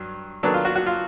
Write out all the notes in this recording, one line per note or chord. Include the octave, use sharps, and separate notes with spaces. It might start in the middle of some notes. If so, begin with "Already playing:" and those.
Already playing: G2 F#3
D#3 F#3 B3 D4 A4
F4
F#4
F#4
F4